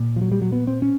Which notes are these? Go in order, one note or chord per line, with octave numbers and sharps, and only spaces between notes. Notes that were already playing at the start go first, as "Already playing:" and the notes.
Already playing: A#2
F3
F#3
G3
F#3
B3
C4
C#4